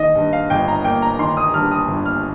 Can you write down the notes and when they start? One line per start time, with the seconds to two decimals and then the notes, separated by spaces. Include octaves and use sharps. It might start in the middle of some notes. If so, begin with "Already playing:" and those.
Already playing: D#3 D#5
0.15 G2
0.33 F5
0.50 G1 G5
0.68 A#5
0.84 A#3 G5
1.02 A#5
1.19 D#3 C6
1.37 D#6
1.54 G2 F6
1.71 D#6
1.88 G1
2.06 F6